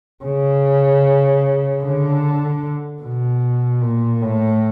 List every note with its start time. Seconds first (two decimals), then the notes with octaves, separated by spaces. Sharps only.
0.24 C#3
1.83 D3
3.02 B2
3.82 A#2
4.22 A2